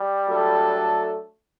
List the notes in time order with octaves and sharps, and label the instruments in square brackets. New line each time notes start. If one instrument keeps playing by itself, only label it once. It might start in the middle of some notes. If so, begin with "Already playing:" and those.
Already playing: [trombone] G3
[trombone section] F#3 A3 D4 A4